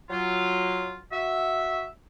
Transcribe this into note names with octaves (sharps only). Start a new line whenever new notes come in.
F#3 F4
F#4 E5